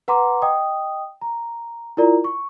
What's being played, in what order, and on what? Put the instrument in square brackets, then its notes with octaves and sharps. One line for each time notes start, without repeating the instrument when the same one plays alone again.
[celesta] B4 F#5 A#5 C6 D6
D#5 G5 D#6
A#5
E4 F4 A#4 D5 A#5
C#6